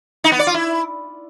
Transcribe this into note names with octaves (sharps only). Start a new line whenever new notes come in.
D#4
B3
D5
F4
E4